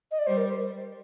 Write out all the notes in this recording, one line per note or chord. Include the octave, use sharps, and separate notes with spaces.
D#5
D5
G3 C5
A#4
C5